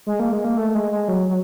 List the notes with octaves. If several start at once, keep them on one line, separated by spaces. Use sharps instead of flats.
G#3
A#3
G#3
A#3
A3
G#3
G#3
F#3
F#3